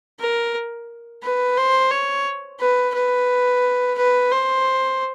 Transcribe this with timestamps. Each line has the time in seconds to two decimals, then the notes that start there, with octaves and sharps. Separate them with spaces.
0.19 A#4
1.23 B4
1.57 C5
1.90 C#5
2.59 B4
2.94 B4
3.97 B4
4.31 C5